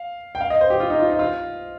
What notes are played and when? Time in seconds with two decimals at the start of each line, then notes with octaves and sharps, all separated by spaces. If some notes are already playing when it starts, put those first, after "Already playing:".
Already playing: F5
0.35 G5
0.41 F5
0.50 D#5
0.61 C5
0.70 G4
0.80 F4
0.90 D#4
1.00 F4
1.10 D#4
1.19 F4